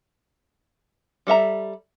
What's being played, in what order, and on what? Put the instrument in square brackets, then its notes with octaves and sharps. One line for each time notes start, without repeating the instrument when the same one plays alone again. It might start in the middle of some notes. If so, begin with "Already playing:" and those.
[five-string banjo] G3 A4 E5 A#5